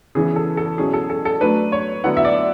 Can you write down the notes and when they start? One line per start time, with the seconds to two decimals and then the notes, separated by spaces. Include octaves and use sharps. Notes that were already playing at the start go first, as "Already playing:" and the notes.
0.15 C#3 E3 B3 E4 G#4
0.36 A4
0.57 A4
0.78 B2 F#3 C#4 E4 G#4
0.93 A4
1.10 A4
1.25 A4
1.41 F#3 A3 D4 B4
1.72 C#5
2.04 D3 F#3 B3 E4 F#5
2.17 E5
2.25 D5